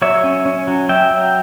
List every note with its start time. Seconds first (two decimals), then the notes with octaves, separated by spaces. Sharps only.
0.02 F#3 C#5 E5
0.24 C#4
0.46 C#4
0.68 F#3
0.89 F#3 E5 G5
1.11 F#3